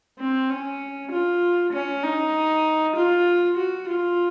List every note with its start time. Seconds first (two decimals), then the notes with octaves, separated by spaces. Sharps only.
0.19 C4
0.50 C#4
1.11 F4
1.73 C#4
2.03 D#4
2.96 F4
3.57 F#4
3.88 F4